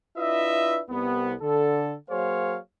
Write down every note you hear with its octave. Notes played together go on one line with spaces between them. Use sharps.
D4 E4 F4 B4 D#5 E5
C2 B3
D3 A4
F#3 A#3 G#4 C5 C#5 F5